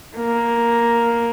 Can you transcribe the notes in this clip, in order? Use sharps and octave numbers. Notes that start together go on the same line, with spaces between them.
A#3